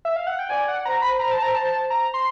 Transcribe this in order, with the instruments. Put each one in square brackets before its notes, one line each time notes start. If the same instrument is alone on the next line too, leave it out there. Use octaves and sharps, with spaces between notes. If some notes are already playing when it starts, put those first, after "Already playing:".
[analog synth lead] E5
F5
F#5
G5
[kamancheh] D5 [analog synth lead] G#5
[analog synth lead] F#5
[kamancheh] C5 [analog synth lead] A#5
[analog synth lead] B5
A#5
A5
A#5
A5
A#5
C6